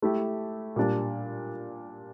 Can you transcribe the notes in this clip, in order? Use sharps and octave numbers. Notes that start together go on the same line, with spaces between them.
A3 E4 G4
A#2 G3 D4